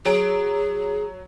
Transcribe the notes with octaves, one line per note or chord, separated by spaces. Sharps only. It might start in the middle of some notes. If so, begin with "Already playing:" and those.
F#3 G#4 D7